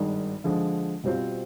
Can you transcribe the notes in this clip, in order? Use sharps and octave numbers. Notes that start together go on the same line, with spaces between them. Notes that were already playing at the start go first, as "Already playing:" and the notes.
Already playing: G#1 G2 D#3 G#3
D3 F3 G#3
B2 G3 C4 F4 C5